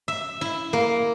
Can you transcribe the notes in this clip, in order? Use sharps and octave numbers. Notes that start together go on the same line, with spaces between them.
E5
E4
A#3